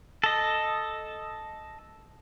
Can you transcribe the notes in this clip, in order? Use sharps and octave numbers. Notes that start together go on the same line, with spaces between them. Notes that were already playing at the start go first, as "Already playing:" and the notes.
A4 D#5